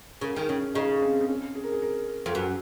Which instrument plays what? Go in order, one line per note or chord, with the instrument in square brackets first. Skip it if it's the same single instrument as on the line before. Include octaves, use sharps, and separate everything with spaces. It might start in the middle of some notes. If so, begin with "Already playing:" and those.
[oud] C#3 [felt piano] A#4
[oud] D#3 [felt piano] G#4
[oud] C#3 [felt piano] C#4
[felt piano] C#4
[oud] C#3 [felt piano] D#4
[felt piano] C4
C4
C#4
G#4
A#4
G#4
A#4
[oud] F2
F#2